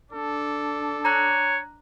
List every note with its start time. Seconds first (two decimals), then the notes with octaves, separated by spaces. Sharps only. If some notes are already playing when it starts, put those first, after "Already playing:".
0.13 D4 A4
1.05 C#5 A#5 F#6